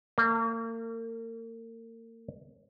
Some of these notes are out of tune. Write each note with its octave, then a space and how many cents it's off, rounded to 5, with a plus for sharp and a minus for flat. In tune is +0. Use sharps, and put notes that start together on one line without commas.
A#3 -35